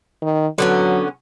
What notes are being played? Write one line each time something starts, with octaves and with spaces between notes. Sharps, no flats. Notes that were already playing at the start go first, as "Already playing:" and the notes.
D#3
D3 F#3 B3 C#4